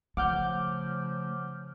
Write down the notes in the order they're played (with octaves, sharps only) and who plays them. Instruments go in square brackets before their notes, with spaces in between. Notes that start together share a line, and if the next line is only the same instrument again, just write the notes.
[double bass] C#3 F3 [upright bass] A3 [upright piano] F#5 [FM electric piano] D6 F6 G6